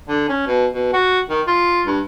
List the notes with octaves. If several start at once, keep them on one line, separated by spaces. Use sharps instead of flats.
D3
C#4
B2
B2
F#4
D#3
F4
G2